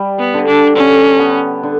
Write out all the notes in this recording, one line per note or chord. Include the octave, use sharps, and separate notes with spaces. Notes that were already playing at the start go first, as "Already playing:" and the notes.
Already playing: G3
B3
D3
D4
D3 C#4
B3
D3